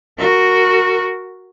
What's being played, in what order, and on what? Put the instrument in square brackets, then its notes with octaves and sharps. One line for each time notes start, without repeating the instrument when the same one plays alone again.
[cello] F#4 A#4